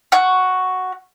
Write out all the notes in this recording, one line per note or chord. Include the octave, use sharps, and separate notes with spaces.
F#4